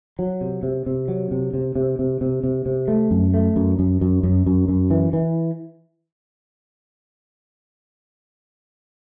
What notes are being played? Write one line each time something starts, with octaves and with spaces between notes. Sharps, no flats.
F#3
C3
C3
C3
F#3
C3
C3
C3
C3
C3
C3
C3
A3
F#2
A3
F#2
F#2
F#2
F#2
F#2
F#2
E3
E3